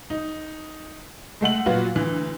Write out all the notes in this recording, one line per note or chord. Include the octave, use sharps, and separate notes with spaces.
D#4
G#3 A3 F#5 F#7
A#2 F#3 F4 F#4 B4
D2 E3